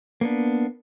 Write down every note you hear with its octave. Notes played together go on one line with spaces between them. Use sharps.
A#3 B3 D4